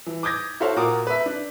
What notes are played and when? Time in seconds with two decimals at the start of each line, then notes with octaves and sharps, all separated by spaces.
0.06 E3
0.23 D6 D#6 G6 G#6 A#6
0.60 E4 F#4 A4 C5 C#5 F5
0.76 A#2 F#4 A#4 D6 D#6
1.07 B4 E5
1.26 D4